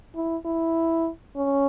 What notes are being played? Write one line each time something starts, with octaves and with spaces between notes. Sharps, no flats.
E4
E4
C#4